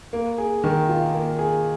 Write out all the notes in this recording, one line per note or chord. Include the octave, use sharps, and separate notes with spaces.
A#3
G#4
D#3
F4
A#3
G#4